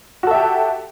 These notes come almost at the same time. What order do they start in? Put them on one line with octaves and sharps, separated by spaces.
F#4 A4 E5 G4